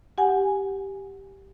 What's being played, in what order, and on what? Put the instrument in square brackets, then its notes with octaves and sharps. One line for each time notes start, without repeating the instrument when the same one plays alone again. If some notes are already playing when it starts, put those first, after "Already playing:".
[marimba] G4 F#5 G#5